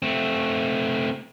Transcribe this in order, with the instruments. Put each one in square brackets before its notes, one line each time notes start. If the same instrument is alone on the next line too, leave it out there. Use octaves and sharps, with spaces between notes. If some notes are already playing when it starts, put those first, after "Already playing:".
[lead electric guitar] A3 C4